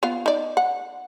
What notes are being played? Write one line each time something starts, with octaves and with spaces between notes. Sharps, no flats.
B3 F4 F5
D#4 D5
F#5